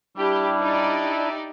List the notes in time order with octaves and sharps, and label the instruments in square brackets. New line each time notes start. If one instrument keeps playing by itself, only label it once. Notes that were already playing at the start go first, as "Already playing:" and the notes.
[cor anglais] G3 [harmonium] D4 E4 [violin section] G4
[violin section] D#4 G4 D5
[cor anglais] E5